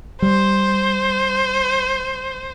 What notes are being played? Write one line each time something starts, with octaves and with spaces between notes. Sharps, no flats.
G3 C5